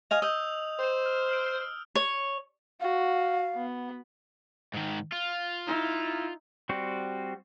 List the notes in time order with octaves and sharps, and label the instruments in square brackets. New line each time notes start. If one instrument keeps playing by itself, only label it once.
[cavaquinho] D#5 F5 G#5 [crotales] F7
[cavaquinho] D#5 [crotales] D#6 E6 G6
[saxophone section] C5
[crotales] F6
E6 F6 D7
[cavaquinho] C#5
[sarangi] F#4 [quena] F5
[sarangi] B3
[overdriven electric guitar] G#2 D#3
F4
[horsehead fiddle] D#4 E4
[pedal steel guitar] G3 C4 F#4